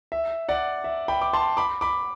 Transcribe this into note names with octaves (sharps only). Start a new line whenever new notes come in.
E5
D5 F#5
E5
G5 B5
D6
A5 C6
B5 D6
B5 D6